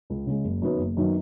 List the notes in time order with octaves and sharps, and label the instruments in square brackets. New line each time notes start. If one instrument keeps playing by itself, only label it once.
[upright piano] C#2
C#3 G#3
F#1
F#2 D#3 F#3 B3
F#1
F#2 D#3 F#3 B3